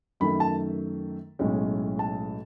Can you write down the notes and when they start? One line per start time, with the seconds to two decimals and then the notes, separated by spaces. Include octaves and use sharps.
0.20 F#2 D#3 A3 B5
0.40 A5
1.39 B1 A2 G#3 C#4
1.99 A5